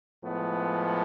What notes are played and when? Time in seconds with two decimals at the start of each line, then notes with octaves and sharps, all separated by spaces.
0.22 A2 F3 G#3 B3